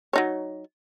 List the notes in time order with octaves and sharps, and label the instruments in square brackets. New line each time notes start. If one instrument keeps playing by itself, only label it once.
[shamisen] F#3 D#4 C#5